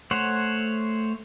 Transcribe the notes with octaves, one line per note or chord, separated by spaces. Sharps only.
A3 C5 C#5 F#5